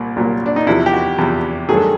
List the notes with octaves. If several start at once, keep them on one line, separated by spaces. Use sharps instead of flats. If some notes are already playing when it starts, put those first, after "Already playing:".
Already playing: C2 A#2 A#3
C2 A#2 F#3 A#3
D4
D#4
E2 C3 F3 E4
G4
F#4
E2 C3 F3
G2 D#3 F#3 A3 G#4
A4